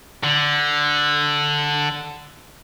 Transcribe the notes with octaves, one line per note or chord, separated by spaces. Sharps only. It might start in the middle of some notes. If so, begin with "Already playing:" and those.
D3